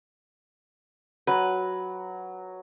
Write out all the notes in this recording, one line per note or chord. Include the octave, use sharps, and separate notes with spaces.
F#3 B4